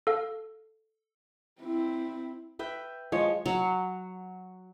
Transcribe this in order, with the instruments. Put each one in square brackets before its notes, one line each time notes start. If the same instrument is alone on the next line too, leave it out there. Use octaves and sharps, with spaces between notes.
[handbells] A4 F5
[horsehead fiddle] C4 E4
[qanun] B4 E5 G5
[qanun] F3 [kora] G#3 C#5
[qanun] F#3